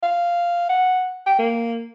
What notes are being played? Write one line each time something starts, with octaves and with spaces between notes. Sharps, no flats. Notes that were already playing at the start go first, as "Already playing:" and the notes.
F5
F#5
G5
A#3